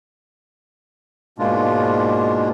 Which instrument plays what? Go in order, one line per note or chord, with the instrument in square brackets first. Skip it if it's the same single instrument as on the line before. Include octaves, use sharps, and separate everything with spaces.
[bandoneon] G#2 B2 G#3 A#3 D4 F4